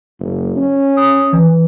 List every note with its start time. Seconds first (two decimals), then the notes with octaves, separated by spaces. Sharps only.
0.20 F#1
0.56 C#4
0.97 D#6
1.33 E3